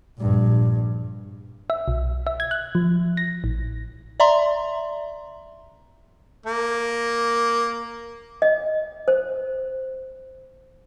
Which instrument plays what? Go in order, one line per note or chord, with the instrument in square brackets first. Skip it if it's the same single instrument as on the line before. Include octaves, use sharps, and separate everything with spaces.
[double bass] A#1 G2
[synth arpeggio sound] E5
B1
E5
G#6
F#6
F3
A#6
A1
[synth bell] D5 E5 A#5 C6
[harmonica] A#3
[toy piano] D#5
C5